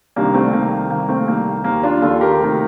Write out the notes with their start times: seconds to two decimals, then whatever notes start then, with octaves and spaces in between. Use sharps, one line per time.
0.16 C2 C3 D#3 A#3 D4
0.34 A3 C4
0.53 C2 C3 D#3 A#3
0.90 C2 C3 D#3 A#3
1.08 A3 C4
1.28 C2 C3 D#3 A#3
1.64 D#2 D#3 A#3
1.83 D4 F4
2.02 D#2 D#3 F4 A4
2.21 G4 A#4
2.39 D2 C3 D#3